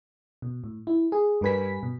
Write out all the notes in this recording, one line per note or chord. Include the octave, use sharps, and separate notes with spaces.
B2
A2
E4
G#4
G2 G3 A#4 B4 G#5 B6
B2